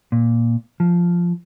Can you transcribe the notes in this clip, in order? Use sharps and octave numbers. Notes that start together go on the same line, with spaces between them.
A#2
F3